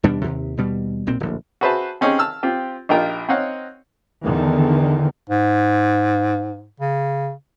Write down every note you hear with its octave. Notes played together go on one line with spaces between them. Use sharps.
D#2 B2 G3 D4
D#2 C3
D#2 B2 G3
B1 A#2 C4
D1 A#1
F#4 G#4 B4 C5 E5 A5
C4 C#4 D#4 G4 G#4
A5 E6 F6
C4 F4 G4
A#1 D#4 F4 G4 A#4 G5
C4 D#4 C#5 D#5 F5 F#5
E2 D3 D#3
G#2
C#3